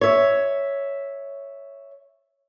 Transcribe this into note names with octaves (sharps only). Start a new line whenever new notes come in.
C#5 E5